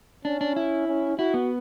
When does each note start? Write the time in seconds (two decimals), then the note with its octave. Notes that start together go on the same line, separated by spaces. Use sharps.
0.25 C#4 D4
0.41 D4
0.56 E4
0.87 C#4
1.18 E4 F#4
1.34 B3